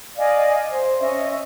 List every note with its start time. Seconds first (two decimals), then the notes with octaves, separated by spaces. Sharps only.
0.17 D5 D#5 F5 G#5
0.72 C5
1.01 C#4 D#5 E5